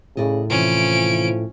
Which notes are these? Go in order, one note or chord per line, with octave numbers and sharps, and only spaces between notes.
A2 C#3 D5 D#5
C3 E3 F3 C#4 D7